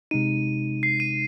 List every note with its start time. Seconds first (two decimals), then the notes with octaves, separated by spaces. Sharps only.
0.11 C3 G#3 D#4 D#7
0.83 C7
1.00 D#7